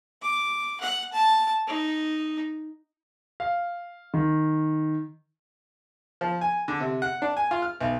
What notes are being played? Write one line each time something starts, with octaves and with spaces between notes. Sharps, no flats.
D6
F#5
A5
D#4
F5
D#3
F3
G#5
D3
C3
F#5
D4
G#5
F4
F6
B1